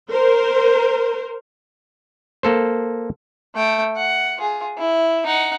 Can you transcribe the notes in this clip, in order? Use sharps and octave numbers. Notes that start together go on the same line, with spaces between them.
A#4 C5
A#3 A4 C5
A3 G5
F#5
F4 G#4
E4
D#4 F#5